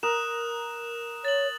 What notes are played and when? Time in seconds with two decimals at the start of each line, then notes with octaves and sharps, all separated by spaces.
0.03 A#4 D#6 F#6 E7
1.25 C#5 A6 F#7